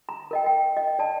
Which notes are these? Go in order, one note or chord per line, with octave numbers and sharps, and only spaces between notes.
A#5
A#4 D#5 G5
G5
D#5
D5 A5